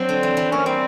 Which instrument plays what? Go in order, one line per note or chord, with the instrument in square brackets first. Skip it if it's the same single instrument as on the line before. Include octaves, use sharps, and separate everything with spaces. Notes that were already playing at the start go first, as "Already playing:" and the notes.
Already playing: [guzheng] F#3 D4 [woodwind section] C4
[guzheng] D3
E3
E3
[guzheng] A#3 [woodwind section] C#4
[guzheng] G3 [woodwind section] C4